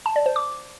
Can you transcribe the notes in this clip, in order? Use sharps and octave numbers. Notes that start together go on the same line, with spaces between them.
A5
D5
C5
D6